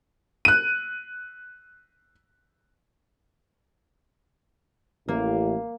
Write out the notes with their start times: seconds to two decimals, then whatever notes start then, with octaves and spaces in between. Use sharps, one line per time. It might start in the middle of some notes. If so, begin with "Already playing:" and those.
0.45 F#6 D#7
5.08 A1 A#3